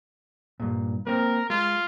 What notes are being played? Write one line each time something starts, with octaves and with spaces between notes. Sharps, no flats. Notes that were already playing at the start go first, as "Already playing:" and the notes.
G2 A#2
A#3 C4 A#4
G#3 F4